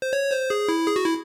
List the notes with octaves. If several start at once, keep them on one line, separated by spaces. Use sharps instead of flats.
C5
C#5
C5
G#4
E4
G#4
F#4
E4